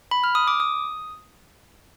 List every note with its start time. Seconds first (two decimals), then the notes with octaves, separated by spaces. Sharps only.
0.11 B5
0.24 F6
0.35 D#6
0.48 D6
0.60 D#6